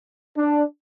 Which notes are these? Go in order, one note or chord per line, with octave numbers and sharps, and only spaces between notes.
D4